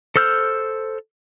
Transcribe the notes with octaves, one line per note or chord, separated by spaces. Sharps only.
A4 C5 E6 F6 G6